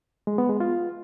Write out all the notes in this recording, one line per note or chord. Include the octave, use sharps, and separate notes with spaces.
G#3
B3
G#3
F4